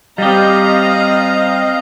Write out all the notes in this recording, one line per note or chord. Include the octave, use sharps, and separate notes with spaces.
G3 C4 G4 D#5 F5 A#5